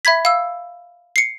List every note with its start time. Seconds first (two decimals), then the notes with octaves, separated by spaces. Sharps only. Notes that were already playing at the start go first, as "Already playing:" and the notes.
0.05 E5 B5 G#6 B6
0.25 F5 E6
1.16 C7 C#7